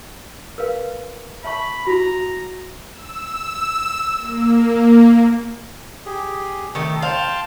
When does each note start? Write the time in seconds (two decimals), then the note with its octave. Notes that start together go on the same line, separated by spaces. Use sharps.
0.58 A#4 B4 F5
1.44 E5 A5 B5 C#6
1.87 E4 F#4 A#5
2.91 E6
4.18 A#3
6.06 G4 G#4
6.75 D#3 A3
7.02 F5 G5 A5 C6